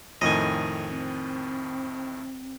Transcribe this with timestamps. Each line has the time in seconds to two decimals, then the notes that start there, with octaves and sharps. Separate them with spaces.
0.21 F2 A2 D#3 D#5 G#5
0.89 C4